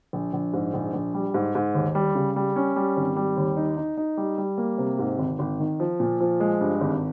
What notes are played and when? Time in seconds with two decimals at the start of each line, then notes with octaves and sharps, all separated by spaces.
0.13 A#1
0.33 A#1
0.53 G#2
0.74 A#1
0.93 A#1
1.14 G3
1.34 G#2
1.55 G#2
1.75 D#2
1.95 G3
2.15 C#3
2.36 G3
2.56 C#4
2.76 G3
2.97 G#1
3.16 G3
3.37 D#2
3.57 D#4
3.77 D#4
3.97 D#4
4.17 G3
4.38 G3
4.58 A#3
4.78 C3
4.99 G#2
5.19 G#1
5.39 G#1
5.60 D#3
5.80 F3
6.00 A#2
6.20 F3
6.40 G#3
6.61 G2
6.81 G#1